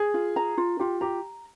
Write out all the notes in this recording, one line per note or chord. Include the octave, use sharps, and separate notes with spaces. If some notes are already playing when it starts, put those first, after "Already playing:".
Already playing: G#4
F4
A#5
F4
F4 G4
G4 A#5